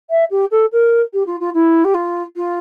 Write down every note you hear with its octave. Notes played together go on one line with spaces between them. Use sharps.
E5
G4
A4
A#4
G4
F4
F4
E4
G4
F4
F4